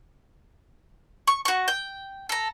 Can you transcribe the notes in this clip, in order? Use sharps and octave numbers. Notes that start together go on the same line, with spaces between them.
C#6
F#4 C#6
G5
A4 A#5